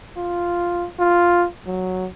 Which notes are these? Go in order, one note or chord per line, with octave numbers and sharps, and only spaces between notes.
F4
F4
F#3